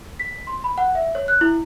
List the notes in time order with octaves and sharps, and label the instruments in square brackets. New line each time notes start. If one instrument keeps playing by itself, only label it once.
[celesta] B6
C6
B5
F#5
E5
C#5
F#6
E4